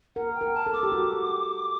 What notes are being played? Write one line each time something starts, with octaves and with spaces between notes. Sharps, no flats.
A#4 F#5
G5
A#4
A5
A4
D6
G4
F#4